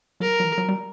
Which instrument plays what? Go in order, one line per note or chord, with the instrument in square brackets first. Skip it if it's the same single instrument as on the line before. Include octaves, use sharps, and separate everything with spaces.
[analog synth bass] F#3 [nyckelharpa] A#4
[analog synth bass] F#3
E3
F#3
G3